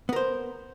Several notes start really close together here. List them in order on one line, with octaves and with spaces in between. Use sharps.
B3 A#4 C5